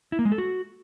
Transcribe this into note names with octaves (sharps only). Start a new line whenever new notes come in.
E4
A#3
G#3
A4
F#4